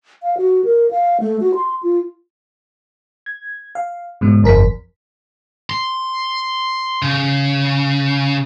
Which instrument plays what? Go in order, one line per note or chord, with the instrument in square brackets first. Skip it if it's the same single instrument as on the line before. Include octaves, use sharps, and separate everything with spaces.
[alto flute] F5
F#4
A#4
F5
A3
F#4
C6
F4
[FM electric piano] G#6
F5
G#2 B2 G#3
G1 F2 A#4 B6
[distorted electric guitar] C6
C#3